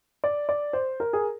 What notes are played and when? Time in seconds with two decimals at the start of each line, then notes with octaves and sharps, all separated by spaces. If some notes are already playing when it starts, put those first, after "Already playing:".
0.24 D5
0.49 D5
0.73 C5
1.00 A#4
1.13 G#4